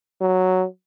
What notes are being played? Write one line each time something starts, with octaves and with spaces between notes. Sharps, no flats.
F#3